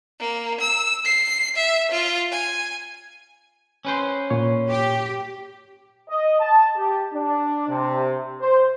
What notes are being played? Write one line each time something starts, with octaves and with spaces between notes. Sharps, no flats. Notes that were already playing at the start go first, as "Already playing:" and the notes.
A#3
E6
C7
E5
F4
G#5
C#4 B4 C5
A#2 C#5
G4
D#5
A5
G4
D4
C3
C5